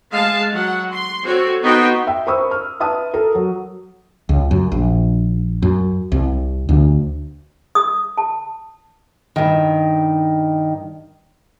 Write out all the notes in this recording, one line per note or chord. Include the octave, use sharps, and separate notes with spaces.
G#3 F5 A5
F#3 F#5
C6
C4 F#4 A4 C#5
B3 D#4 F#4 G5 C6
E5 G5
A#4 C5 B5 C#6 D#6 E6
F6
B4 E5 A5 D#6
A4 A#4
F#3
C#2
F#2
A#1
F#2
C2
D2
D#6
A5
G2 D#3